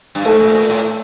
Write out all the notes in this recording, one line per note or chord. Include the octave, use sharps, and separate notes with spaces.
G2
G#2 A3
A#2
A#2
A2